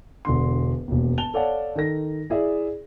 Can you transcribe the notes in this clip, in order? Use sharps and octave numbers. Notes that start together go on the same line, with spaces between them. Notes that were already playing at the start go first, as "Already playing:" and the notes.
E1 D3 C6
E1 D#2
A5 F7 G7
A4 C#5 D5 F5 F#5 A5
D#3 A4 A#6
E4 G#4 D5 E5